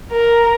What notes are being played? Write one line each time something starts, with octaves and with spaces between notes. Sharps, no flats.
A#4